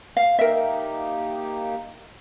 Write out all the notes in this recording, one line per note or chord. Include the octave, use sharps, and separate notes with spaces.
F5
A#3 D#4 G4 A#4 E5